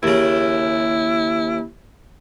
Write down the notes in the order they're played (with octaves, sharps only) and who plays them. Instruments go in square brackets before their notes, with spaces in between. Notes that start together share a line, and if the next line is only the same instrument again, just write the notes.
[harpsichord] D#2 C#3 [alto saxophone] E4